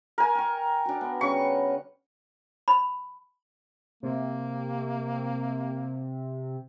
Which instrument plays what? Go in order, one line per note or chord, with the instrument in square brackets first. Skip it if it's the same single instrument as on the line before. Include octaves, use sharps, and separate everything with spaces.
[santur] A#4 G#5
[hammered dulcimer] G5 C#6
D4 F#4
B3
[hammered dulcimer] C#3 G3 B4 [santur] C#6
[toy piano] B5
[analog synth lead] C3 [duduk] A#3